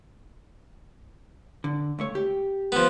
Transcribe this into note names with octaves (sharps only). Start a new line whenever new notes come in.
D3
C#2 A3 C#5
G4
F3 B3